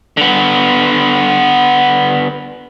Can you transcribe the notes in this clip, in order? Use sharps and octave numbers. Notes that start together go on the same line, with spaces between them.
D3 B3